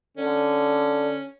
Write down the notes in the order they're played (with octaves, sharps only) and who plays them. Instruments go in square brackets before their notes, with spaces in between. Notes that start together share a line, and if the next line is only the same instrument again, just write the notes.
[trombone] D3 [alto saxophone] C#4